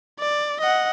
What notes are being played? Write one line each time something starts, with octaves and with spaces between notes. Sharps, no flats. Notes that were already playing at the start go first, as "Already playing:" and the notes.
D5
D#5 F#5